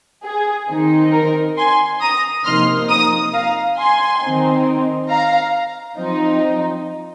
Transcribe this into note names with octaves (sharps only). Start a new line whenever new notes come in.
G#4
D#3 C4 D#4
A#4
G#5 C6
A#5 D#6
C3 F3 A#3 D#4 C6 F6
A#5 D#6
F5 A#5
G#5 C6
D#3 C4 D#4
F5 A#5
F3 C4 D#4